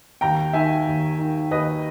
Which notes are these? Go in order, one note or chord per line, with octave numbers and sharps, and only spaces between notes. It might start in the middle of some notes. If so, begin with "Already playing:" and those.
D#2 G5 A#5
D#3 E5 G#5
D#2
D#3
D#2 B4 D#5